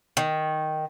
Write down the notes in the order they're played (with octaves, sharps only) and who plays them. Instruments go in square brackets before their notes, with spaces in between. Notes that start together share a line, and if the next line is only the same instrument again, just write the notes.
[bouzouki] D#3